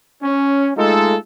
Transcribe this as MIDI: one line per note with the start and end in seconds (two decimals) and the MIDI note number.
0.22 0.71 61
0.77 1.16 56
0.77 1.16 57
0.77 1.16 63
0.77 1.16 65
0.77 1.16 69